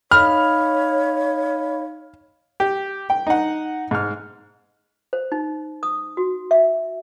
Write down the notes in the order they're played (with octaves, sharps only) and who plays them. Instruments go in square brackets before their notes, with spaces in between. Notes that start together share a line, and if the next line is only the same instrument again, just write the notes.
[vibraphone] D#4 D#5 F5 [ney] C#5 [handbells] B5 [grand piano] F6
[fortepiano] G4
G5
D#4 F#5
G#2 F6
[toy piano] C5
D#4
D#6
F#4
E5